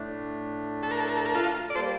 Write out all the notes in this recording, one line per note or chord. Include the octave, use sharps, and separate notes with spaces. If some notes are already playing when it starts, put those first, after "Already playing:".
Already playing: A2 A3 D4
A4
A#4
A4
A#4
A4
A#4
F4 A4
D5
G3 A#3 F4 A4 C5